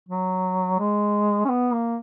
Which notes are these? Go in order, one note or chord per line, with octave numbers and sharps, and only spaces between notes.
F#3
G#3
C#4
B3
A#3